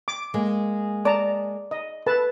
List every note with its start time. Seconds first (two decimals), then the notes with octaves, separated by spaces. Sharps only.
0.08 D6
0.34 G#3 A#3 G#4
1.05 D5 A5 A#5
1.71 D#5
2.06 A4 B4 A5